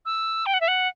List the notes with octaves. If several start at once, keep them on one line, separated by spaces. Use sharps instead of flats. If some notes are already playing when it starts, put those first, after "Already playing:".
E6
G5
F#5
E5
F#5